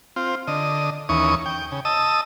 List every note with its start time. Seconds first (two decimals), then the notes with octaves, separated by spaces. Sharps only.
0.16 C4 F4
0.48 D3 D#5
1.09 D#2 E3 C#4 C#6 D#6
1.46 G5
1.72 C#3
1.85 D#5 A5 D#6 E6